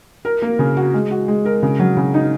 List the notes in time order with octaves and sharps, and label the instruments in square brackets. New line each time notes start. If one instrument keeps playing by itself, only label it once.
[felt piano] A#4
A#3
C#3
F#4
G#3
F#4
G#3
A#4
C#3
F#3
C#3
D#4